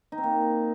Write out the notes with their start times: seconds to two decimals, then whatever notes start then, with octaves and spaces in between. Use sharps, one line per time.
0.12 D#4
0.18 C4
0.23 A#3